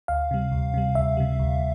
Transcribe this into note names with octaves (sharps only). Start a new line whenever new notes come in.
D2 F5
C3 G3
D2
C3 G3
D2 E5
C3 G3
D2